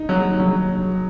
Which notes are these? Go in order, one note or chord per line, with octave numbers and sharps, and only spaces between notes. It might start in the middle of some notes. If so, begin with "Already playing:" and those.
Already playing: D#4
F#3
F#3